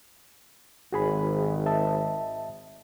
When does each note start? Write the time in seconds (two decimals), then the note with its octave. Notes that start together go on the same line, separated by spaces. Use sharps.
0.93 G#1 F#4 G#4 B5
1.66 D#5 E5 A5